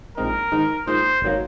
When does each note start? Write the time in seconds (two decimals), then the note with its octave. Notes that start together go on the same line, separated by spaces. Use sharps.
0.17 A#1 A#2 G#3 C4 D#4 A#4
0.52 G#2 D#3 G#3 D#4
0.87 A#2 G#3 D#4 C5
1.22 G#1 D#3 F#3 A#3